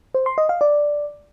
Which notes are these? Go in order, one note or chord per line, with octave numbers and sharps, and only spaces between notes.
C5
C6
D#5
F5
D5